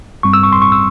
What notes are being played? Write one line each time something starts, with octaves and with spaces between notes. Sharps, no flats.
G2 G3 C4 C#6
E6
C#6
C6
C#6
E6